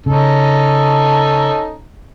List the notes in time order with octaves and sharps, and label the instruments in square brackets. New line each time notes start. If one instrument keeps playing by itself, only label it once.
[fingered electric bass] C#3 [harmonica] C#4 D#4 A4